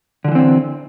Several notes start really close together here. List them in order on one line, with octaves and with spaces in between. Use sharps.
D3 F3 E3 C4